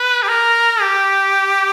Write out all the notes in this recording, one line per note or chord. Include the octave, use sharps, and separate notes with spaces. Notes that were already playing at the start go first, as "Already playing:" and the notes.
Already playing: B4
G4
A#4
G4